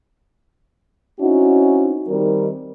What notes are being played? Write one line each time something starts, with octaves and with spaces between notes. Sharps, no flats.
C4 C#4 D#4 E4 F#4
D#3 G3 C4 D#4 A#4